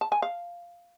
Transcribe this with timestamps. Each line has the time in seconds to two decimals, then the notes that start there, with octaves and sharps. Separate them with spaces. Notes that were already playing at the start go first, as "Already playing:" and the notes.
0.01 A5
0.12 G#5
0.22 F5